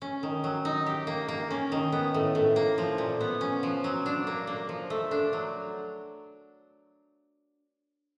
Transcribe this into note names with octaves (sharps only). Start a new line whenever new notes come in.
C#4
D#3
F#3
D#4
G4
A#3
A#3
C#4
D#3
B3
A2
A2
A#3
F3
A#2
B3
C#4
F3
F#3
D4
A#3
A#3
F3
A3
D4
F#3